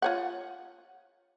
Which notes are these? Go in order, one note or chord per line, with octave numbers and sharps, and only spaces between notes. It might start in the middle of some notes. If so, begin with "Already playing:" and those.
F4 C#5 F#5